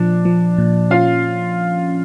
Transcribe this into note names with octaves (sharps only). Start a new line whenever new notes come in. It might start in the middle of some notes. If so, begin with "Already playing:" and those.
Already playing: A#2 F3 D4
F3
A#2
C#4 F4 F5